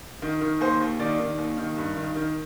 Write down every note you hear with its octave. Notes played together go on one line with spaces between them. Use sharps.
D#3
D#3
D#2 C5
D#2
D#3 D5
D#3
D#2
D#3
G2
D#3
D#3